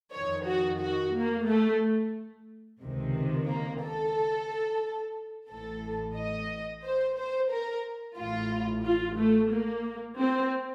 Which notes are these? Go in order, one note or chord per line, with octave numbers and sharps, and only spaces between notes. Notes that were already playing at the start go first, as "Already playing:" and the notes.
F2 D#3 C#5
F#4
F#4
A#3
A3
C#2 C3 D#3
A#3
A4
A1 A2 A4
D#5
C5
C5
A#4
A1 A2 F4
F4
A3
A#3
C4